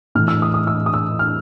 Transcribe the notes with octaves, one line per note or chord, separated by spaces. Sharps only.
A2 E3 F6
E6
D#6
D#6
E6
D#6
E6
F6